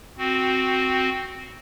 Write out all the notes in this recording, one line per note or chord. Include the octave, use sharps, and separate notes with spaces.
C4 F#4